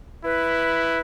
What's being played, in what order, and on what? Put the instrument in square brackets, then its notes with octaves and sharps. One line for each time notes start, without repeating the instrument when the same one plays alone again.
[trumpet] E4 [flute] B4